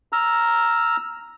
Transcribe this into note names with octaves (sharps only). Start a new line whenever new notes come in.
A#5 E6 F6